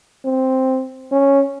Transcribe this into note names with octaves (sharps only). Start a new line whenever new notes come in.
C4
C#4